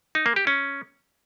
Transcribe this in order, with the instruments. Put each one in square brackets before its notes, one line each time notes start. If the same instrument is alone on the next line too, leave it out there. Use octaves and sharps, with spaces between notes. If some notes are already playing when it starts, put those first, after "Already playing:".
[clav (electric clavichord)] D#4
A#3
G4
C#4